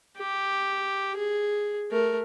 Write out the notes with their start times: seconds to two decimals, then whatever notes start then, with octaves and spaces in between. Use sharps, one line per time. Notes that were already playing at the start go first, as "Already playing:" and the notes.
0.18 G4
1.17 G#4
1.91 A3 A#4